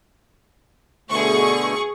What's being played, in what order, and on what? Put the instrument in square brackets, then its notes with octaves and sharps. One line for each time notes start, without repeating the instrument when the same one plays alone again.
[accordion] B2 D3 A3 [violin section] G#4 C#6